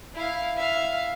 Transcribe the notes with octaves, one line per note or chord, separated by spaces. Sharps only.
E4 F5
E5 F5